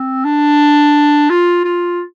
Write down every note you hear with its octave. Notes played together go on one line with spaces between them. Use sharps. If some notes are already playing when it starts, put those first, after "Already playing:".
Already playing: C4
D4
F4
F4